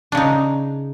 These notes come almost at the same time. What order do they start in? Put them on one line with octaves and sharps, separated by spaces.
D4 C#3 D#4